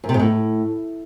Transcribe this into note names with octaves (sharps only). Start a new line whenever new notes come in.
F#2
C3
G#2
A2